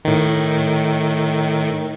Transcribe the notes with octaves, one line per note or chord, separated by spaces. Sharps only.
A2 D#3